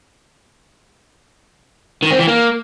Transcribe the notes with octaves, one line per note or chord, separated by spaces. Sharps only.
D#3
C4
E3
A#3